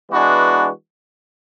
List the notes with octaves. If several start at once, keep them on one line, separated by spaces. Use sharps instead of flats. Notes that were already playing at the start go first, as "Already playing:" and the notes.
E3 G#3 B3 D4 F#4